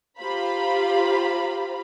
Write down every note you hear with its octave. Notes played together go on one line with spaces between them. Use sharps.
F4 G4 C5 F5 A#5 B5